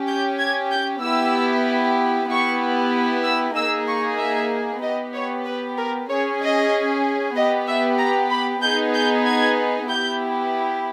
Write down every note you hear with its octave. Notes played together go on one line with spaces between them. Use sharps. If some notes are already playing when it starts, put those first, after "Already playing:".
Already playing: C#4 G4
G6
G#6
G6
B3 E4 G4 E6
B3 E4 G4 C#6
E6
A#3 D#4 G#4 E6
C#6
E5
B3 G4 D#5
C#5
B4
A#4
C#4 G#4 C#5
D#5
B3 G4 D#5
E5
A#5
B5
B3 D#4 G#4 G6
G6
G#6
B3 E4 G4 G6